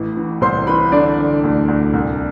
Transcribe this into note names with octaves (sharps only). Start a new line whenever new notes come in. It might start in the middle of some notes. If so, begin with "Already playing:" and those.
Already playing: A1 A2 E3
E3
C2 C5 C6
E3 B4 B5
D3 D4 D5
D3
D2
D2
C2